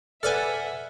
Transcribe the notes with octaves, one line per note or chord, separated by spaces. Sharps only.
A4 B4 D5 E5 F#5 G#5 F6